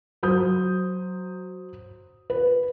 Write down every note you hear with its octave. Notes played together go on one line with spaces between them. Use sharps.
F#3 C5 D#6 G6
B4